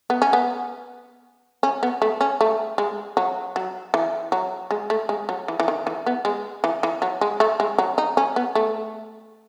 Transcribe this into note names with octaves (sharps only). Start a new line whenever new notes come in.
B3
C#4
B3
C#4
B3
A3
C#4
A3
G#3
F#3
F#3
E3
F#3
G#3
A3
G#3
F#3
E3
E3
D#3
E3
B3
G#3
E3
E3
F#3
G#3
A3
G#3
F#3
D#4
C#4
B3
A3